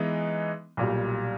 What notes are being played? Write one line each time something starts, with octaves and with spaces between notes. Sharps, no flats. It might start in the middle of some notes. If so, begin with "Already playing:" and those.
Already playing: E3 G#3 B3 D#4
B1 A#2 G3